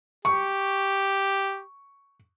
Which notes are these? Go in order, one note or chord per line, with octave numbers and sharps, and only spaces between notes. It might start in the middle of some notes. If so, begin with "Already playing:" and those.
G4 C#6